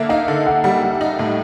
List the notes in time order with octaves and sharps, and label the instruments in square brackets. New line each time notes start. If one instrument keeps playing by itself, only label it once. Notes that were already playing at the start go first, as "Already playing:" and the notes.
Already playing: [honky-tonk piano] D3 A#3 [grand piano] E5
[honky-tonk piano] D#4 [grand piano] F5
[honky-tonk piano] D3
[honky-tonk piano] D3 [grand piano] F#5
[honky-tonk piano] G3
G3
D#4
A2